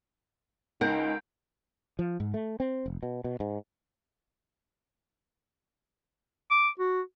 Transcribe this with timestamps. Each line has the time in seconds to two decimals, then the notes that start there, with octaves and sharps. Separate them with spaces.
0.81 C#2 D#4 A#4 F#5 G5
1.99 F3
2.20 G#2
2.34 A3
2.60 C4
2.86 F1
3.03 B2
3.24 B2
3.40 G#2
6.51 D6
6.79 F#4